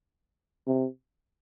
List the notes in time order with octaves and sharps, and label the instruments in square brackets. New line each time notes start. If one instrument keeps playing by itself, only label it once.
[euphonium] C3